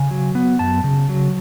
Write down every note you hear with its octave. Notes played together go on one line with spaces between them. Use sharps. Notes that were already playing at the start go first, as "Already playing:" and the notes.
Already playing: C#3 G#5
F#3
B3
F#2 A5
C#3
F#3